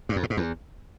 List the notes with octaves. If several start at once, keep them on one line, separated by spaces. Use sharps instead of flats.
G2
F2
A2
G#2
E2